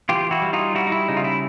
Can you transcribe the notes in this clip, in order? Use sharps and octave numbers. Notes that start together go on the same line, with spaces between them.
E3 F4 G4
E4 F#4
G3
D#4 F4
G3 E4 F#4
D#4
E4
C#3 D#4
F4
E4